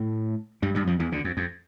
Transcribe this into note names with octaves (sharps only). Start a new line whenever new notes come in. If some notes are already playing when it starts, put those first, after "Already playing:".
Already playing: A2 A3
G2 G3
G2 G3
F2 F3
E2 E3
D2 D3
F2
F2